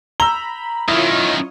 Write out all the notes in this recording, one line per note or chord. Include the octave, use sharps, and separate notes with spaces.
A#5 B5 E6 G7
F#2 D#3 E4 F4 C#5 D#5